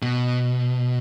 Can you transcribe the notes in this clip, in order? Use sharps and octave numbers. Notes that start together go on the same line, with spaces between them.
B2